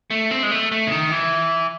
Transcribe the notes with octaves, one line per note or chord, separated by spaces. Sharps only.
A3
C4
G#3
A3
A3
C#3
D#3
E3